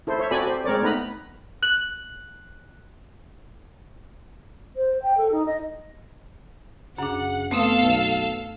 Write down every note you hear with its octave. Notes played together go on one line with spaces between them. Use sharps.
E4 A4 C5
C5 C#5 E5
C4 F#4 A4 D5 G#5 B5
G4 C5
G#3 C4 A#4 C#5 D5
A3 B3 D#4 B4 A#5 B5
F#6 F#7
C5
G5
A4
D#4
D#5
F#2 C#3 D4 F#5
A3 B3 C4 A4 F5 D#6 E6
B1